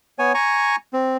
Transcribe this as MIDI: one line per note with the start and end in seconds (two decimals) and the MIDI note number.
0.19 0.33 59
0.19 0.33 73
0.19 0.33 80
0.34 0.76 80
0.34 0.76 82
0.34 0.76 85
0.93 1.17 60